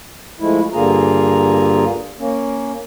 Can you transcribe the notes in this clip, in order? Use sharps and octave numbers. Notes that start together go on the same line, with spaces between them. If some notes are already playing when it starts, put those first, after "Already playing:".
F3 G#3 A3 E4
G2 D3 A#3 F4 G#4 A#5
A#3 C#4